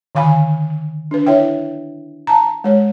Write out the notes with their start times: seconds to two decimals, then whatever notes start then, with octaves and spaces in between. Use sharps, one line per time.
0.15 D3 D#3 F5 G#5 B5
1.11 D4 B4
1.26 E4 C#5 E5 G5
2.27 A5 A#5
2.64 G#3 C#5